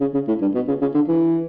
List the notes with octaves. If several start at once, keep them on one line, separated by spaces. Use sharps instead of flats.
C#3
C#3
A2
G2
B2
C#3
C#3
D3
E3